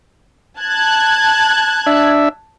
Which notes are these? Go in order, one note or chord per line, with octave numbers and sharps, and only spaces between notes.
A5 F#6 G#6
D4 E5